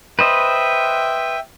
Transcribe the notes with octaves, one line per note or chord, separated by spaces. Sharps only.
B4 C5 D#5 E5 G5